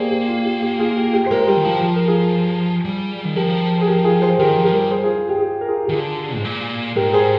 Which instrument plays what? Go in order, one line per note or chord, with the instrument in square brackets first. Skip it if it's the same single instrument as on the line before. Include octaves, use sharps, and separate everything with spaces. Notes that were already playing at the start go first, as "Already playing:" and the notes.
Already playing: [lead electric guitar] A#3 [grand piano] G4 G#4 A#4 C5 D5
[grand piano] G4
F4
G4
G4
F4 G#4
F4
G4
G4
C5
[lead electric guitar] G#3 [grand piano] G4 A#4
[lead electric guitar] G3 [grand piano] G4
[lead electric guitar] D#3
[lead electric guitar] F3 [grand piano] F4
[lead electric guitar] F3
[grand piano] A#4
F4 G#4
[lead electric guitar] G3
D#3
[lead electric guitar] F3 [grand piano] G4 A#4
[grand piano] G#4
G4 A#4
F4 G#4
G#4 C5
[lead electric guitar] D#3 [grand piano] G4 A#4
[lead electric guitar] F3
[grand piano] G4 A#4
[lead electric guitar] G3
[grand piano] G#4 C5
F4 G#4
F4
G4
G#4
G4
A#4
F4 G#4
G4
[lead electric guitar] D#3
[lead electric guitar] D3 [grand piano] F4 G#4
[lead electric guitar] G#2
A#2
[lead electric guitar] G#2 [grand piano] G4 A#4
[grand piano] G#4 C5